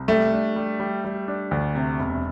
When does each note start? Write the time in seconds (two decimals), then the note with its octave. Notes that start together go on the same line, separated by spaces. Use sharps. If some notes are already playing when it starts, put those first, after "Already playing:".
Already playing: C2
0.08 G3 A3
0.33 D4
0.56 G3
0.80 G3
1.05 G3
1.28 D4
1.51 D2
1.75 C3
2.00 E1